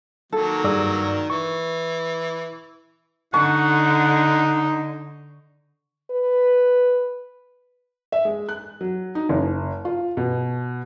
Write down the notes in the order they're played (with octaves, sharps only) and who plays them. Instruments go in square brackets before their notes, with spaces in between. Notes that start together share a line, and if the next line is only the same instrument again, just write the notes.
[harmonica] D#3 F#3 A#3 [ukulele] A4
[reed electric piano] G2 D5 E6 [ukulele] G#4
[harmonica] E3 [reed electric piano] C#6
[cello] D3 [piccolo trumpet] D#4 [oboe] F#5 [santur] C#6
[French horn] B4
[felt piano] E5
G#3
F#6
F#3
D#4
F#1
F4
B2